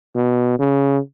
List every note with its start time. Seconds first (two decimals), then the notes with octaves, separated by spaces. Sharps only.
0.15 B2
0.59 C#3